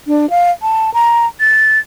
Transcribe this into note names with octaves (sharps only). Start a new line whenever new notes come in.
D4
F5
A5
A#5
A6